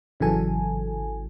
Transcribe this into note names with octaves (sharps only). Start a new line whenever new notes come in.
G#1 C#3 E3 F#3 A4 G#5